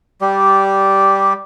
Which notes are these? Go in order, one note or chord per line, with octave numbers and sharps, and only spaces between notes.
G3 G4 D5